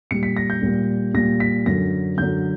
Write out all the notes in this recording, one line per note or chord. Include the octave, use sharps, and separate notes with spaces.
A#2 G3 C#7
B6
A#6
G6
A#2 G3
A#2 G3 A#6
B6
F#2 D3 F#3 A#6
F#2 D3 F#3 G6